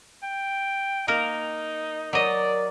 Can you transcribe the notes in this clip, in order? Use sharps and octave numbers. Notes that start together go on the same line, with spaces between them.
G5
A#3 D#4 A#4
F#3 A#4 D5 D#5